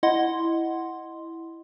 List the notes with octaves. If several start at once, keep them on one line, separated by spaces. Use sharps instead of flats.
E4 D#5 F#5 C6